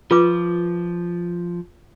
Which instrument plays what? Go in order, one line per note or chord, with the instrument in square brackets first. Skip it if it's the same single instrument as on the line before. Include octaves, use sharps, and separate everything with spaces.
[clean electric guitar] F3 [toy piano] F4 B4 D6